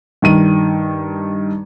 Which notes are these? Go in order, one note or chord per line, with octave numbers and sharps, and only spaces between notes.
G2 D#3 D#7